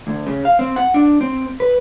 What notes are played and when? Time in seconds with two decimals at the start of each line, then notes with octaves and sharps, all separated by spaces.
0.07 D2
0.27 C#3
0.45 F5
0.59 C4
0.76 F#5
0.94 D4
1.21 C4
1.60 B4